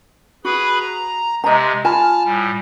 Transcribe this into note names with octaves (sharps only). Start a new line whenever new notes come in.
F#4 G#4 B4 B5
A#5
C3 G#3 D#5 A#5
F4 G#5 A5 B5 F6
A2 G3